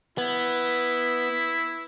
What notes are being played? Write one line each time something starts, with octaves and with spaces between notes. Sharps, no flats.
B3 E4